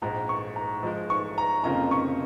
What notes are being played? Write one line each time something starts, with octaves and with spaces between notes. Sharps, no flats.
A#1 G#2 G#3 A#5
C#6
A#5
G#2 F3 G#3
C#6
A#5
F1 F2 C#3 A#3 F4 A#5
C#6